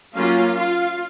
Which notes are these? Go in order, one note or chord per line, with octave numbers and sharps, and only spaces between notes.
F#3 A#3 C#4 F4 F5
F4 F5